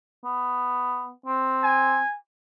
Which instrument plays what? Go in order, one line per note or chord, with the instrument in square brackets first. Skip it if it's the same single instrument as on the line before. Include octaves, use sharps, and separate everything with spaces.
[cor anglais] B3
C4
[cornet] G#5